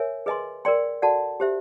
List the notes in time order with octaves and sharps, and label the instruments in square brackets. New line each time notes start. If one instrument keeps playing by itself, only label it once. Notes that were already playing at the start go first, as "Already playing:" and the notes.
Already playing: [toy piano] A#4 C#5 E5 G#5
G#4 B4 D#5 G#5 C6
A#4 D5 G5 C6
F#4 A4 D5 F#5 A5
G4 C5 E5